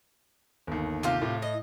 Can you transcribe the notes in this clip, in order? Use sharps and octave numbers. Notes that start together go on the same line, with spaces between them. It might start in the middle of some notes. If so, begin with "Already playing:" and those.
G1 D#2
C3 F4 G4
A2
D#5